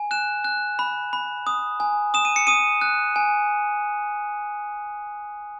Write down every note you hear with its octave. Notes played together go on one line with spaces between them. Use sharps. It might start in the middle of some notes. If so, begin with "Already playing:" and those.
Already playing: G#5
F#6 E7
F#6
B5
B5
D#6
G#5
D#6 E7
D#7
C#7
D#6 D#7
F#6
G#5